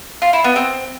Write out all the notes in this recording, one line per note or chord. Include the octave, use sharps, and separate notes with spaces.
F4
E4
B3
C4